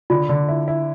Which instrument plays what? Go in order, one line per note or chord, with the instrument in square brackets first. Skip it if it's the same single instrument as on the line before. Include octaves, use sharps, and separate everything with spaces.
[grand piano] D3 [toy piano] F4
[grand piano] D3
E4
E4